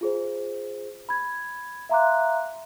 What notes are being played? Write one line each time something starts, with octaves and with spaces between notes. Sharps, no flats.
F4 G#4 C5
B5 G#6
E5 F5 A#5 C6 D6 F#6